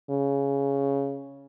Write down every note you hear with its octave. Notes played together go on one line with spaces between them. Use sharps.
C#3